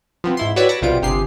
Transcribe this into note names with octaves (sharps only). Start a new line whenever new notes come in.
F3 B3 C4
G#2 E4 C6
F#4 G4 B4 C#5 D5 E5
A5 B5 D6 A#6 C#7
B1 C3 G3 B3 F4 D7
G1 C3 G4 G#4 C7